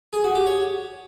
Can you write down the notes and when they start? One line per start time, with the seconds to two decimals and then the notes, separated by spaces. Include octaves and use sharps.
0.13 G#4
0.24 F#4
0.35 G4
0.46 C#5